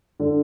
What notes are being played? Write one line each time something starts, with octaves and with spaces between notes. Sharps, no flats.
D3